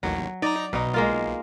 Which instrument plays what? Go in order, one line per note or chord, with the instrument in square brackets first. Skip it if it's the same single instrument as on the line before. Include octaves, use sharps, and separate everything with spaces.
[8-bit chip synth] A1 D#2 [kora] F#3
[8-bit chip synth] D#4 A#5 [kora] D5
[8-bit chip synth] B1 [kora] B2 D#4
[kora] G#3 A#3 F4